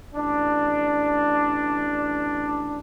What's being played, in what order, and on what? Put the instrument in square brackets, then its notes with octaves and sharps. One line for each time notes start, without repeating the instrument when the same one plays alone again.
[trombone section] A1 D4